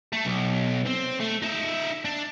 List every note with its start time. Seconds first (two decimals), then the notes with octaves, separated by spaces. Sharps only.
0.13 A3 A4
0.25 B1
0.86 C4
1.20 A3
1.42 D#4 E5
2.05 D4